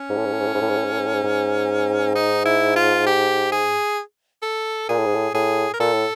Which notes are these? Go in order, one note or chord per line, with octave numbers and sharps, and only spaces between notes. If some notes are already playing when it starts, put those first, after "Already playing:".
Already playing: C#4
G#2
A2
G#2
A2
G#2
A2
G#2
A2
G#2
A2
G#2
A2
G#2
A2
G#2
G#2
D#4
E4
F4
G4
G#4
A4
A#2 G#4
A2
G#2
A2
A2 G#4
A#4
A#2 A4
A2